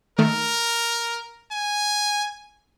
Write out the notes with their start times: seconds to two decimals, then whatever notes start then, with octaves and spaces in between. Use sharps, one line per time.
0.19 D#3 A3 A#4
1.52 G#5